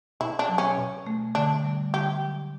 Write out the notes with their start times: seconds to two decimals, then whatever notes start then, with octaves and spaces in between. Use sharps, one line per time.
0.20 B2 E4
0.39 D4
0.49 F#3
0.58 C#4
0.78 B2
1.07 A3
1.35 D3 D4
1.65 G3
1.93 D3 G4
2.22 F#3